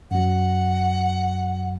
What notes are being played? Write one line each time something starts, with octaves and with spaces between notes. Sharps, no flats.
F#2 F#3 F#5